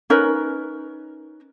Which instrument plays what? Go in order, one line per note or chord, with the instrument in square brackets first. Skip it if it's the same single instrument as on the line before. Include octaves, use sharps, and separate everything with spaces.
[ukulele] C#4 D#4 A#4 B4